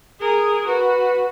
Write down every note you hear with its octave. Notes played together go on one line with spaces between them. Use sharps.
G#4 A#4
F#4 B4